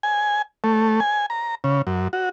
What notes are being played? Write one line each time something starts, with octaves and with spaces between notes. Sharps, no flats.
G#5
A3
G#5
A#5
C#3
F#2
F#4